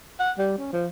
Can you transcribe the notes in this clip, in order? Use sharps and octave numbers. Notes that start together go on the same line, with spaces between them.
F#5
G3
C#4
F3